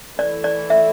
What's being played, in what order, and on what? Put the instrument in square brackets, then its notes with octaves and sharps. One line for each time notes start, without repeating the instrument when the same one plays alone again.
[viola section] E3 A3 E4 A4 [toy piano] D5
[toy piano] D5
E5